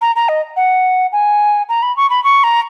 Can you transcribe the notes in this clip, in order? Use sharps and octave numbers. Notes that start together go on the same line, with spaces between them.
A#5
A#5
D#5
F#5
G#5
A#5
B5
C#6
B5
C#6
A#5